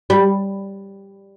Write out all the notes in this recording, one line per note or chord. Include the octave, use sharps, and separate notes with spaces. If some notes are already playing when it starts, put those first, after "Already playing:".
G3